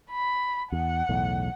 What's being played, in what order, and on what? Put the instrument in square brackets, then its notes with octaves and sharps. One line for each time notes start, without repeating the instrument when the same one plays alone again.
[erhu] B5
[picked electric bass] E2 [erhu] F#5
[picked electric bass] B1 E2 A2